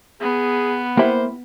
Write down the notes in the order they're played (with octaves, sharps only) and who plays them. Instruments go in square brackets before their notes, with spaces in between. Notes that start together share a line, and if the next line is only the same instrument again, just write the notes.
[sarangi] B3 [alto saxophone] G#4
[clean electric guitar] A#3 [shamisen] E4 G4 [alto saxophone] C5